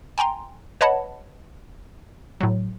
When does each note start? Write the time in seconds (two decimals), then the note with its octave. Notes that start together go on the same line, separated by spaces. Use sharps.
0.18 G5 G#5 A#5 C6
0.81 B4 C#5 D#5 F#5 A5 B5
2.41 A2 F#3